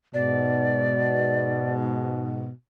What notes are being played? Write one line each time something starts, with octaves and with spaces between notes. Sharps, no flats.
G#2 B2 D5